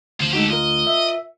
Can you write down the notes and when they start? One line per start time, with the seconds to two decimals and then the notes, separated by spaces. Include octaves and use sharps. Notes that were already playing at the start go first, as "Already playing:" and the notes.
0.20 D2 F4 C5
0.33 G#3 D#4 F#4 G4 A4
0.50 F4 A#4 D#5
0.87 E5